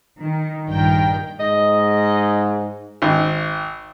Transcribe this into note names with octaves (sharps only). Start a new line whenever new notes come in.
D#3
A#1 G2 D#3 A#4 G5
G#2 D#5
G#1